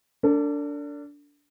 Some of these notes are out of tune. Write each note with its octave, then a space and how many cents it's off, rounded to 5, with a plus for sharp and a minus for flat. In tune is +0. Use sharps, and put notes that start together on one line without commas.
D4 -20 A4 +45